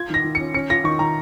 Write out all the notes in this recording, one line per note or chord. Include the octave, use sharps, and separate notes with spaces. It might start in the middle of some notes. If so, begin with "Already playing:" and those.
Already playing: F4 G#6
D#3 A#6
D#3
C#4 C#7
C#4 C#7
F4 A#6
D#3 C#6
D#3 A#5